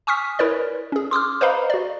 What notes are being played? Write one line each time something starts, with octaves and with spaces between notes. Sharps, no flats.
G#5 C#6 D#6 F6 B6
E4 A#4 B4 C#5 D5
C#4 G#4
C6 D6 D#6 F6
B4 C5 D#5 F5 A#5 B5
F#4 D5